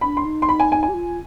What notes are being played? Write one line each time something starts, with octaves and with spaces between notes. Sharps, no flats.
D4 B5
C6
D#4
C6
B5
G#5
G#5
G#5
G4
F4